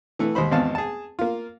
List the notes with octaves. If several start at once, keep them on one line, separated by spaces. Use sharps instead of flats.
E3 A3 B3
D#2 G#3 C5 B5
G#1 E2 G#3 F5 A5
G#4 A5
A#3 F4